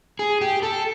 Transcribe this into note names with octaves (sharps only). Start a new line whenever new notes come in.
G#4
G4
A4